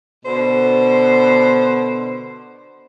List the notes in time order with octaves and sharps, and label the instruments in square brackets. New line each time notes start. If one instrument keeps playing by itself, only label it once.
[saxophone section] B2 D3 C5